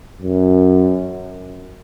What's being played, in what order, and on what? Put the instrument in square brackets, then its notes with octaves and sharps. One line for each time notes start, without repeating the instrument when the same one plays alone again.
[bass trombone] F#2